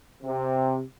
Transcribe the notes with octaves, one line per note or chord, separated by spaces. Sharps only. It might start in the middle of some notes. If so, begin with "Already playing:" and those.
C3